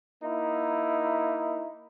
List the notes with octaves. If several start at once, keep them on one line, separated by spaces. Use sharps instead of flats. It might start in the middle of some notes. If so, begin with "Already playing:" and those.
A#3 D#4 E4